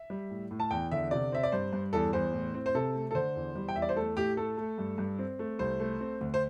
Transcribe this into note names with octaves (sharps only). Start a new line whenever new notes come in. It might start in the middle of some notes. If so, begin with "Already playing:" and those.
Already playing: E5
G3
A2
A2
A5
E2 G5
D3 E5
C3 D5
C4 E5
D5
G2 C5
G2
E2 A4
E2 C5
A2
C4
C5
C3 A4
A3
A4
D3 C5
E2
G3
G5
E2 E5
D5
C5
A3 A4
A2 G4
A3 A4
A3
G2
G2
C4
A3
C2 C5
A3
C4
D2
C5